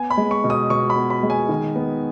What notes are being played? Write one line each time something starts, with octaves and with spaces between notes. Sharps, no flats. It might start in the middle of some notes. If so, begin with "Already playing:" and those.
Already playing: B3 G#5
B5
G#3
C#6
B2
D#6
B2 C#6
B5
B3
B5
G#3
G#5
D#3
B3